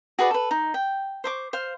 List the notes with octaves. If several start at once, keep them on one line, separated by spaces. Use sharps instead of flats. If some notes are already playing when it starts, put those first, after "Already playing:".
F#4 G#4 B4 D5
A4 B4
D#4
G5
C5 C#6 D6
C5 F5